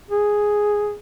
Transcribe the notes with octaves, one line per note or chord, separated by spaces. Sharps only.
G#4